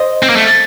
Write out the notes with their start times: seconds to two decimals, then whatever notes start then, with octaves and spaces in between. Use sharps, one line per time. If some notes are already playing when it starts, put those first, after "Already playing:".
Already playing: C5 D#5
0.23 C4
0.30 A#3
0.36 A3